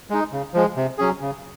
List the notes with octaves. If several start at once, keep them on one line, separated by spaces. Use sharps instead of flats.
G#3 D#4
C#3
F3 G#3
C3
F#3 C#4 G#4
C#3